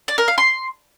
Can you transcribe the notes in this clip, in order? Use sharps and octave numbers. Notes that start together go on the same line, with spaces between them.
D5
A#4
F5
C6